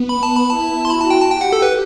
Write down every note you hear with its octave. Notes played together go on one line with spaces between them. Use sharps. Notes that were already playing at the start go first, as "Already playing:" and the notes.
Already playing: B3
B5
A5
B5
E4 A5
C6
F#4 B5
A5
G5
A5
G4 G5
F#5
A4
B4